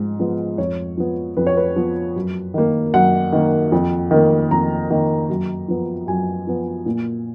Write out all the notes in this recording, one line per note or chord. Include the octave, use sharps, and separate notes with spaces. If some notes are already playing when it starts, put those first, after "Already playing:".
Already playing: G#2 F3 G#3
F3 G#3 B3
F2 C#5
F3 B3
F2 B4
C#5
B4
F3 B3
F#2
D#3 A#3
F#2 F#5
D#3 A#3
F2
D#3 A#3
F2 A#5
D#3 A#3
F#2
F3 B3
F#2 G#5
F3 B3
A#2